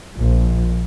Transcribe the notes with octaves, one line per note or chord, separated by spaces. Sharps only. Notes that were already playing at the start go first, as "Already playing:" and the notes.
A#1